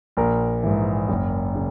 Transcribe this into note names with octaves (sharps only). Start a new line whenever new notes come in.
A#1 A#4
G#2 E3
F#1
C#3